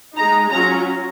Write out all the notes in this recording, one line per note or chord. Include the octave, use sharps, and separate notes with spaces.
G#3 D#4 A#5
F#3 C#4 F4 A#5